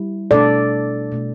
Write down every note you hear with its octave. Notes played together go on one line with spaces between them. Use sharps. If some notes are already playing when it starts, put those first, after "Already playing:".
Already playing: G3 E4
B2 A3 D4 A4 D5
B2 A3 D4